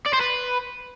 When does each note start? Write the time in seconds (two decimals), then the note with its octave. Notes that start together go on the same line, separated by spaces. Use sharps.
0.06 D5
0.14 C5
0.21 B4